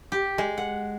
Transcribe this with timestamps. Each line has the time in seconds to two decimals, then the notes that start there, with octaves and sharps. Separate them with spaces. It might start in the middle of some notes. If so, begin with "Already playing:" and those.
0.12 G4
0.38 G#3
0.58 F#5